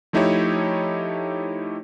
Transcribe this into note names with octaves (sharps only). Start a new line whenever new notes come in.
F3 A3 D#4 E4 G4 C#5